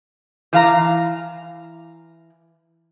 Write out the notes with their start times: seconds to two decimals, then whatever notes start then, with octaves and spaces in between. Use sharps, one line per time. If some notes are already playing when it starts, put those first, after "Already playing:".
0.53 E3 F5 A#5